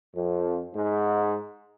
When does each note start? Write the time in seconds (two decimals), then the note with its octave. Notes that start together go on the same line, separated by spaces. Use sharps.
0.15 F2
0.75 G#2